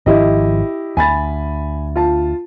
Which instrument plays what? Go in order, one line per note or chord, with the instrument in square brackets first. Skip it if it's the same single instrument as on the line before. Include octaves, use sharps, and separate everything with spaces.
[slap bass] G#1 F3 [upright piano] E4 G4 D#5
[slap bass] D2 [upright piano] G#5 B5 A6
[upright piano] F4 A5